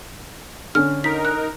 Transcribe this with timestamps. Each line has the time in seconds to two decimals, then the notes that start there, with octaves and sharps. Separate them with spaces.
0.75 D3 C#4 F6
1.04 D#4 A#4 B6
1.25 F#6